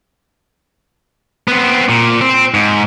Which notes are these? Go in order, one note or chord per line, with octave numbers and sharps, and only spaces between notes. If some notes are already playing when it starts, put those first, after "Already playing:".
B3 C4
A#2
C4
G#2